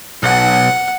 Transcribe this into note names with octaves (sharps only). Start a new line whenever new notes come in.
B1 F#5